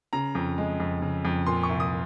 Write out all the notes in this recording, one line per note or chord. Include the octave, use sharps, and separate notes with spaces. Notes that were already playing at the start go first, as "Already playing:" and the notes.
C#3 A#5
F2
G#3
F2
C#3
F2
A#2 C6
C#6
C2
D#6